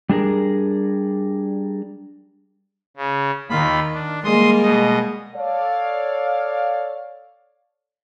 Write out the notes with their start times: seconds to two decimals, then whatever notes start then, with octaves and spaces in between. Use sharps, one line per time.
0.09 G3 D4 G#4 A#4
2.97 C#3
3.50 D#2 D#3 F4 B5
3.93 D4
4.24 G3 G#3 A#3 C6 D#6
4.63 B2 D#5
5.35 A4 C#5 D5 F5